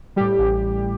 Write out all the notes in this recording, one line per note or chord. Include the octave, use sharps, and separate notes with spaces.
A2 G3 G4
A1